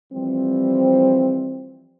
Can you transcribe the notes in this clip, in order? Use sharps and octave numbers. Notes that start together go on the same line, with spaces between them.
E3 F3 G3 C4